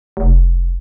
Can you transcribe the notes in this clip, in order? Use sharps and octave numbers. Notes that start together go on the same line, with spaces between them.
F1